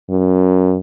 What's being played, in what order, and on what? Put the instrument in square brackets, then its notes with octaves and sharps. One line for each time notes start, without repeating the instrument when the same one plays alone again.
[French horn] F#2